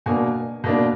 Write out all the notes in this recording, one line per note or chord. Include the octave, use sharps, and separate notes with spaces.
B2 A#3 D4 G#5
B2 A#3 D4